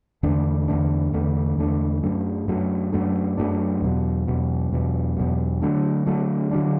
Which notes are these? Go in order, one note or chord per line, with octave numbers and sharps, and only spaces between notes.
E2 D3 A3 D4
E2 D3 A3 D4
E2 D3 A3 D4
E2 D3 A3 D4
F#2 F#3 A3 D4
F#2 F#3 A3 D4
F#2 F#3 A3 D4
F#2 F#3 A3 D4
E2 B2 F#3
E2 B2 F#3
E2 B2 F#3
E2 B2 F#3
D3 F#3 A3 D4
D3 F#3 A3 D4
D3 F#3 A3 D4